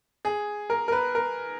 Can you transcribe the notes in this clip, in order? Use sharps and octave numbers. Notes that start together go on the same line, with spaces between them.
G#4
A#4
A#4
B4
A#4